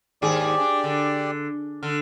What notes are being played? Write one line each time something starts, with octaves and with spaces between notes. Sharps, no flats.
D#2 G#2 G4 G#4 D5
D4
D3
D3 F6